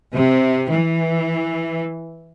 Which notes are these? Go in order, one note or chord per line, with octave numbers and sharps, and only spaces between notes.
C3
E3